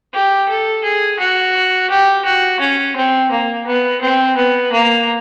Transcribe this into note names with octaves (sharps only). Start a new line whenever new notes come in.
G4
A4
G#4
F#4
G4
F#4
C#4
C4
A#3
B3
C4
B3
A#3